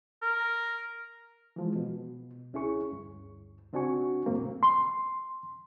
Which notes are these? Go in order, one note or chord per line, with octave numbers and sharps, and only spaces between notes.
A#4
E3 F3 G#3
B2
C#2 C#4 E4 G#4 C#6
D2 G2
C#3 C4 D4 F#4 G#5 C#6
F#2 A2 C3 A#3 C4
C6